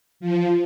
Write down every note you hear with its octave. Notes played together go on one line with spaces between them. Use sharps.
F3